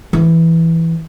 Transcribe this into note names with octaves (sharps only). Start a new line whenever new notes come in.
E3